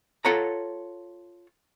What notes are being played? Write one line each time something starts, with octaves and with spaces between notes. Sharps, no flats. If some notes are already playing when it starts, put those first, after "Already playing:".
F4 A4 C#5 F#5 A#5